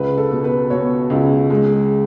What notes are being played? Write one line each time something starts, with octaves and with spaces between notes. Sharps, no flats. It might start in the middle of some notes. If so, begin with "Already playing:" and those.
Already playing: C#2 B4
A4
B2
B4
B2 C#5
C#2
G#3